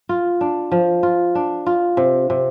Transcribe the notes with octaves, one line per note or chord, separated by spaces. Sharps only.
F4
D4
F3
F4
D4
F4
C3
C3